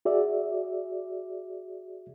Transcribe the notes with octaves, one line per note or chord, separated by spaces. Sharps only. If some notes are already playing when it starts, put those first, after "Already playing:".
F#4 G#4 D5 E5